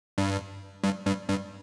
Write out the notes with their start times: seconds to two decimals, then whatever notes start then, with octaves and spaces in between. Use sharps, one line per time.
0.18 G2
0.84 G2
1.06 G2
1.29 G2